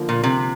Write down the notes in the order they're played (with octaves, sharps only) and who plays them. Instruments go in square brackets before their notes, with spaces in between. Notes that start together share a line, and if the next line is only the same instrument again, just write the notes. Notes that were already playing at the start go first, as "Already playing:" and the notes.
Already playing: [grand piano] D3 F3 A#3 F4
[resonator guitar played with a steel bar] A#2
C3